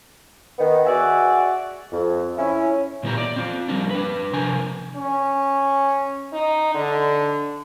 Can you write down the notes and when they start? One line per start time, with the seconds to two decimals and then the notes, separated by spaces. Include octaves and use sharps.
0.58 D#3 B3
0.86 F#4 G#4 D5 E5 F#5 G#5
1.92 F2
2.37 C#4 E4
3.03 A#2 E3 B3 D#4 G4 A#5
3.18 D5
3.36 C4 F4
3.68 F3 G3 A#3 D4
3.91 D4 B4
4.33 C3 F3 A#4 G#5
4.96 C#4
6.33 D#4
6.75 D3